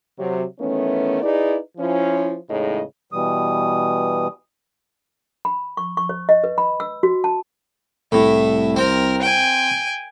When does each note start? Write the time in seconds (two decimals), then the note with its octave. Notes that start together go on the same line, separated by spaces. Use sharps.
0.18 C3 F#3
0.59 D#3 E3 A3 B3 C#4
1.23 D#4 E4 G#4 B4 D5
1.78 F3 C#4 E4
2.49 E2 A2 C#3 G#3 D#4 D#5
3.13 B2 E3 G3 D#6
5.45 B5
5.77 C#6
5.97 C#6
6.09 C5
6.29 D#5
6.44 B4
6.58 B5
6.80 E6
7.03 F#4
7.24 A5
8.12 C2 A2 E5
8.76 C4 A#4
9.22 G5 G#5